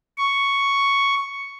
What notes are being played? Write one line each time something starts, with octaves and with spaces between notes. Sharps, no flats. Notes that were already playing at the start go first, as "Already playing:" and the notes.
C#6